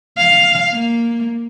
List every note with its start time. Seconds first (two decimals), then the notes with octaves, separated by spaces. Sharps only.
0.17 F5
0.74 A#3